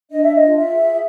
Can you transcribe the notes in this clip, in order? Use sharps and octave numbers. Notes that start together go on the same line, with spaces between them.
D4 D#5
E5
D#5
F4
E5
G#4